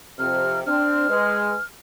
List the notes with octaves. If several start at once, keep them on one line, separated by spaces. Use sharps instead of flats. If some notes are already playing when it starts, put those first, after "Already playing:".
F2 C3 F6
C4 D4 F6
G#3 B4